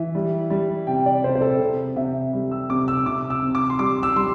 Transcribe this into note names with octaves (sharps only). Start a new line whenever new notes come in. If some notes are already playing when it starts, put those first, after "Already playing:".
Already playing: E3 E5
G3
G3
C3 G5
D5
C3 C5
C5
A4
C3
C3 E5
G3
E6
C3 D6
E6
C3 D6
E6
C3
D6
C6
G3 D6
E6
G3 C6